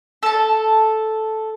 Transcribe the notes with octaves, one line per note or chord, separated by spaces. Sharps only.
A4 A5